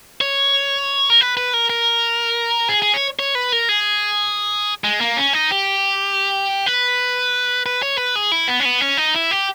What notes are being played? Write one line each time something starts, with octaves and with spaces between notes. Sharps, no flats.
C#5
A#4
B4
B4
A#4
A#4
G#4
G#4
C#5
C#5
B4
A#4
G#4
G#3
A#3
C#4
D#4
G4
B4
B4
C#5
B4
G#4
E4
B3
C#4
B3
C#4
D#4
E4
G4